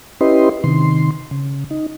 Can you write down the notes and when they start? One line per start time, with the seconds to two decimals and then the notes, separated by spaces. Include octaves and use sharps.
0.21 C#4 E4 G4 B4 D#5 C6
0.64 C3 D#3 C6
1.31 C#3
1.71 D#4